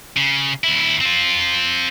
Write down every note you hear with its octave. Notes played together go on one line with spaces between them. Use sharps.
C#3
D2 E4
C4 F4